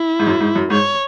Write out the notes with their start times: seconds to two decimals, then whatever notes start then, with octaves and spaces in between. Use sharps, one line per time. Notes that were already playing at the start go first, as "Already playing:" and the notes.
Already playing: E4
0.19 G#2
0.27 F#2
0.40 G#2
0.55 F#2
0.70 G#2 C#5